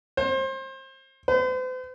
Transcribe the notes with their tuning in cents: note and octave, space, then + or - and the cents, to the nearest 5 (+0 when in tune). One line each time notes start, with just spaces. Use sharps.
C5 +30
C5 -45